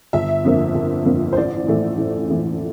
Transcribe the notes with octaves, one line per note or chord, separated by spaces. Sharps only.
G1 E5
F2 D3 F3 A#3
G1
F2 D3 F3 A#3
C5
A1 D5
A2 E3 A3
A1
A2 E3 A3